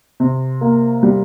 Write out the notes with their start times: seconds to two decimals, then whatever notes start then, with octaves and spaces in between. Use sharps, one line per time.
0.20 C3
0.61 A#3
1.03 G3